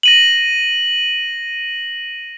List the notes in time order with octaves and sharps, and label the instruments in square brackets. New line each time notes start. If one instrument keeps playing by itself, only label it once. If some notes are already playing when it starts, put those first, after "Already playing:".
[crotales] A#6 D#7 F#7